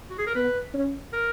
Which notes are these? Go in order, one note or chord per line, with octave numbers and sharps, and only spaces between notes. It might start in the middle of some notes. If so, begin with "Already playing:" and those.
F#4
G#4
A#4
B3 B4
C#4
A#4